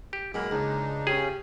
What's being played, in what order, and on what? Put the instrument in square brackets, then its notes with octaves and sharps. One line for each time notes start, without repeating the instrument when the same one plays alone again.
[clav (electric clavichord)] G4
[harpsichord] F#2 [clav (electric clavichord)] E3 A#3 [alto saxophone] G#3 [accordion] B5
[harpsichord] C#2 [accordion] D4 D#4
[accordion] C#3 C#4 [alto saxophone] G4 [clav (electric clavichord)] G#4